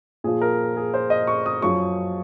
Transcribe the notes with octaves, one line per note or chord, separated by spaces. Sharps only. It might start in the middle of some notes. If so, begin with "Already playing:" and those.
A#2 F3 G#4
A#4
G#4
C5
D#5
C#6
D#6
F#2 F3 C#6